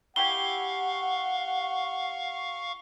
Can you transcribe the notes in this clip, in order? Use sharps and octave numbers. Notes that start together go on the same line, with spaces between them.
E4 G4 F5 F#5 G#5 C#6 G7